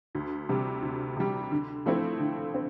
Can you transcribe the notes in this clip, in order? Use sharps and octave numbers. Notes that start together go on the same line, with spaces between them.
D2
C3 G3
D2
C3 G3
D3
F3 A3 C4 E4
D3
C4